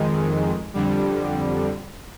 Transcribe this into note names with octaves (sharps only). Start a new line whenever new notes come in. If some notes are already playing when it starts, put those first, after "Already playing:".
Already playing: F2 D#3 G#3
F2 D3 G3